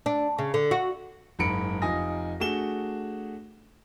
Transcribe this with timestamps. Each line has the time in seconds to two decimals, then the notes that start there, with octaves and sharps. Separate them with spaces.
0.06 D4
0.38 C#3
0.54 D3
0.71 F#4
1.39 F#1 G#2 B5 C#7 D7
1.82 F1 D#4 F4 G#5 D#6 A#6
2.40 A3 D4 F#4 G#4 E7 G7